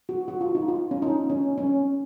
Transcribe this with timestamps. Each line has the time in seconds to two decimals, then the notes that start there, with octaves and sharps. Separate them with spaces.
0.09 F#4
0.28 F#4
0.41 F4
0.55 D#4
0.68 F4
0.91 C#4
1.02 D#4
1.30 C#4
1.58 C#4